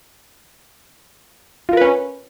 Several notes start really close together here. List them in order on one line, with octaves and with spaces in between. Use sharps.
F4 A#4 B4 C#4